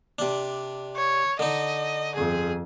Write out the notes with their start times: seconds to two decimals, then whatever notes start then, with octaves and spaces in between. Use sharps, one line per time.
0.19 C3 D4
0.96 C#5
1.39 D3 D#4 D#5
2.15 G1 F2 G#4